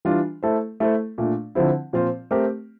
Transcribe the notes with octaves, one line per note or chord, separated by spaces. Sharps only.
E3 G3 D4 F4
A3 E4 A4 C5
A3 E4 A4 C5
A#2 A3 D4
D3 F3 C4 E4
A#2 F3 C4 F4 C5
A3 C4 G4 A#4